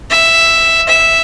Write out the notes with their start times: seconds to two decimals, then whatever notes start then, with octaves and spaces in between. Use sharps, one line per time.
0.10 E5
0.88 E5